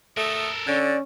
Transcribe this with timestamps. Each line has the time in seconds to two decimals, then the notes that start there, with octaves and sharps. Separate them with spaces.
0.17 A3 A4 A#4 D#6
0.67 D3 C#4 D5